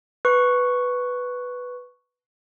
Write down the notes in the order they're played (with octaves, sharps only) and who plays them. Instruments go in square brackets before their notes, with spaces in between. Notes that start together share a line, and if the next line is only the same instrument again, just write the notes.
[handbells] B4 C#6